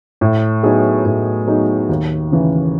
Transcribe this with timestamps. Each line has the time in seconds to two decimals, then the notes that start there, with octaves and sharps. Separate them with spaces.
0.21 A2
0.63 F#3 B3 D#4 G#4
1.05 A2
1.47 F#3 B3 D#4 G#4
1.89 D#2
2.31 C#3 E3